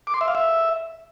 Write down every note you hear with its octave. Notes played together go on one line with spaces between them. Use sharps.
D6
C6
E5
F5
E5